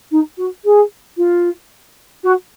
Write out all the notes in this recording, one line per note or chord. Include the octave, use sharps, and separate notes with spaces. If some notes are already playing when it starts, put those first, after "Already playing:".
D#4
F#4
G#4
F4
F#4